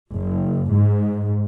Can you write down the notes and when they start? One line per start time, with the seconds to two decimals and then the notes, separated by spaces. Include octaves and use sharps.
0.12 F#1
0.71 G#2